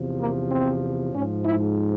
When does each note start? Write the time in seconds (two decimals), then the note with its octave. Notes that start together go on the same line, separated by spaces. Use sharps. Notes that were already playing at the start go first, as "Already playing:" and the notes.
Already playing: E2 C3 F3
0.20 A#3
0.52 C4
1.14 G#2 F3 C#4
1.45 E4